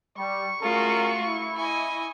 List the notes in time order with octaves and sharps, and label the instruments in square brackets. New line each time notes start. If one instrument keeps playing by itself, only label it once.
[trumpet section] G3 [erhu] C#6
[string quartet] A3 F4 F#4 [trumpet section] C#4 G#4 A#4
[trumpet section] E4
[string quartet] D#5 G#5